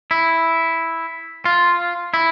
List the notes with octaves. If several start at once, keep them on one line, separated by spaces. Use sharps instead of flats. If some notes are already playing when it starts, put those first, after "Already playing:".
E4
F4
E4